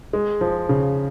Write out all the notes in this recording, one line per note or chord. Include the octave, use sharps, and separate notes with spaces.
G#3
F3
C#3